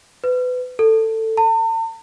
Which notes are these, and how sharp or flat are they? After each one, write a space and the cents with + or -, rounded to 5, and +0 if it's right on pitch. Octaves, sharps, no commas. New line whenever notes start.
B4 +25
A4 +15
A5 +45